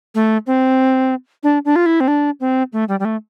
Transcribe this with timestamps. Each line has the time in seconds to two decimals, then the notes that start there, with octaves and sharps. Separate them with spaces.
0.15 A3
0.47 C4
1.43 D4
1.65 D4
1.76 F4
1.86 E4
2.00 C4
2.08 D4
2.40 C4
2.73 A3
2.89 G3
3.00 G3
3.05 A3